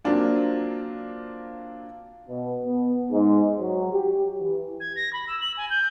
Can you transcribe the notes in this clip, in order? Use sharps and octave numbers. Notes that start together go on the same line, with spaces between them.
F#3 A#3 C4 D4 F4
B2
B3
G#2
F#3
G4
E3
G#6
A#6
B5
E6
F#7
G#5
G6